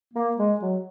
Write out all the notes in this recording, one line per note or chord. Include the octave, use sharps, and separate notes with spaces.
A#3
G#3
F#3